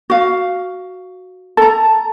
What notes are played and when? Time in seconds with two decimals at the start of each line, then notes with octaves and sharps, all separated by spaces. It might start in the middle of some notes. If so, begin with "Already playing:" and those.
0.10 F#4 F5
1.57 A4 A5 A#5